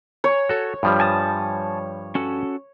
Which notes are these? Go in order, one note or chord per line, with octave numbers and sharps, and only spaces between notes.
C#5
F#4 A4
G2 F3 G3
G#5 A5 D#6
C#4 F#4 A4